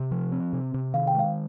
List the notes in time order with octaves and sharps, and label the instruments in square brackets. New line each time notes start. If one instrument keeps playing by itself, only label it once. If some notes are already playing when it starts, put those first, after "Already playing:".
Already playing: [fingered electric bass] C3
F3
C4
C3
C3
[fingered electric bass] D#3 [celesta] F5
[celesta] G5
[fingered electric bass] G#3 [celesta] F5